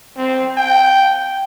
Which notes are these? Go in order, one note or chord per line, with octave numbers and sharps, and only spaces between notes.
C4
G5